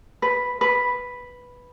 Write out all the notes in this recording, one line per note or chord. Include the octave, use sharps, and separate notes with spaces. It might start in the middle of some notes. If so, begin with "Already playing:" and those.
B4
B4